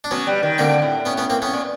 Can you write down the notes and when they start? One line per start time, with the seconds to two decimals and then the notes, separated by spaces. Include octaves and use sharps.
0.04 D4
0.11 F#3 B3 C#4
0.27 G3
0.43 D#3
0.58 D3 A#3 C4
0.82 A2
1.05 B3 C#4
1.18 B3 C#4
1.30 A#3 C4
1.42 B3 C#4
1.53 A#2